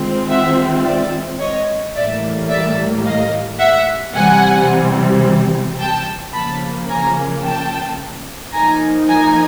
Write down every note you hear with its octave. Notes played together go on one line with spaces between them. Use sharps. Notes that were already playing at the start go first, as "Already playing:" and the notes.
Already playing: D#3 G#3 C4 F4
E5 F#5
D5 E5
C#5 D#5
A2 E3 G3 A#3 D5 E5
D5 E5
D#5 F5
E5 F#5
C3 E3 G3 C4 F#5 G#5
G5 A5
C#3 F3 A#3 A5 B5
G#5 A#5
G5 A5
F3 A#3 D#4 G#5 A#5
G#5 A#5